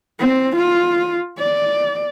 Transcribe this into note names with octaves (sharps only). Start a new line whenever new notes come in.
C4
F4
D5